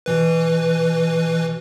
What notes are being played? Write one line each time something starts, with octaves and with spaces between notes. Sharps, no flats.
B2 E3 B4